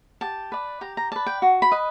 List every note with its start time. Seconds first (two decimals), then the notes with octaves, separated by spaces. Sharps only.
0.21 G4 A5
0.52 B4 D5
0.81 G4 A#5
0.97 A#5
1.12 B4 D5 A5
1.26 G5
1.42 F#4
1.62 B5
1.72 B4 D#5